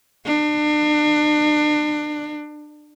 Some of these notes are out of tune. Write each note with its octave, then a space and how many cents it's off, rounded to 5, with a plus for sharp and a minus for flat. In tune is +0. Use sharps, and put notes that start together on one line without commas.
D4 +35